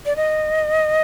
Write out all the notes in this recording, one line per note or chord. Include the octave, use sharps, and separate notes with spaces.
D5
D#5